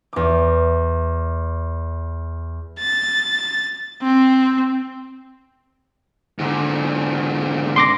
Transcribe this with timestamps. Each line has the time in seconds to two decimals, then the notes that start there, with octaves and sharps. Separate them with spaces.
0.13 E2 D6
2.80 A6
4.02 C4
6.38 G#2 D3
7.76 C6 D6 A#6